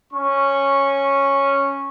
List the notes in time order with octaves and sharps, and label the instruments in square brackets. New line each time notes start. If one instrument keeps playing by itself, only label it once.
[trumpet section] C#4 C#6